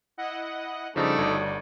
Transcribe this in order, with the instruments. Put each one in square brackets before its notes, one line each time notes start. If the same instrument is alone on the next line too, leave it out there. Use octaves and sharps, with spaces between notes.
[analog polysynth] E4 D#5 F#5
[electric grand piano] C#3 F3 [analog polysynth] G3 F#4 [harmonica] A3 D4 D#4
[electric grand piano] G1 D5